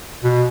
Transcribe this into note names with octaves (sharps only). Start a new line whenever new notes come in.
B2